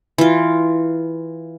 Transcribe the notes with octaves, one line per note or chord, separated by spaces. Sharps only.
E3 F4